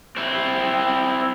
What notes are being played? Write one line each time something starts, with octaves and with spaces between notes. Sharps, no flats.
C4 E4